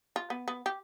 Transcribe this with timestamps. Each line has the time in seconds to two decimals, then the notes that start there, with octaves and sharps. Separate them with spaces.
0.16 F4
0.30 B3
0.48 B3
0.66 G4